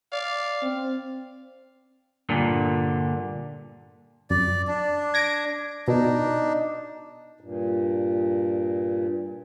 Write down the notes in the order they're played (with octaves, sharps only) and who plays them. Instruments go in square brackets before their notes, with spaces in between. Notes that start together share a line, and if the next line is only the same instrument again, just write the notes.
[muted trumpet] D5 [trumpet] F5
[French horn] C4
[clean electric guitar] G2 A#2 D3
[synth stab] F#2 [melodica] D5
[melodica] D4
[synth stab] G#6 A#6 D7
[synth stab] B2 [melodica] D4 D#4
[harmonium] G2 A#2